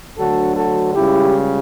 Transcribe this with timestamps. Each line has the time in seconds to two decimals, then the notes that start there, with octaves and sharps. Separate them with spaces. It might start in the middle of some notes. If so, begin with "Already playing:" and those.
0.18 D2 D3 F#3 F#4 A4
0.56 F#4 A4
0.95 C#2 C#3 G3 E4 G4